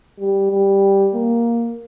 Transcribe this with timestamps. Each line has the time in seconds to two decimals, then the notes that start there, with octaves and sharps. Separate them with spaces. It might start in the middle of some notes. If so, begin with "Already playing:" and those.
0.20 G3
0.52 G3
1.15 A#3